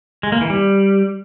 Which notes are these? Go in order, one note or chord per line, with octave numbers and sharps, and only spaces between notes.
G#3
A#3
E3
G3